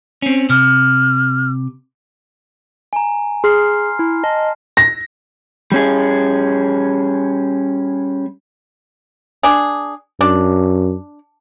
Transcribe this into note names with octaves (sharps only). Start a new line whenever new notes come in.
C4 C#4
C3 F6
G#5 A#5
G#4 C6 F6 C7
E4
D#5 A5
A#6
G3 C#4 G#4
D4 G#4
F#2 D4